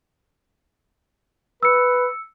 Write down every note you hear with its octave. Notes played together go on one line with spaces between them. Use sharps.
B4 E6 C#7